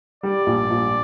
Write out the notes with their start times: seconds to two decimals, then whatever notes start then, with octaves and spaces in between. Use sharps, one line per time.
0.23 G3 D5
0.46 A#1
0.70 A#1